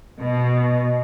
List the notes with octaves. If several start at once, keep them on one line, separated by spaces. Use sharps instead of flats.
B2